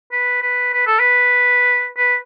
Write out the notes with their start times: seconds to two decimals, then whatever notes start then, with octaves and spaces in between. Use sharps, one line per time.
0.12 B4
0.42 B4
0.73 B4
0.87 A4
0.99 B4
1.97 B4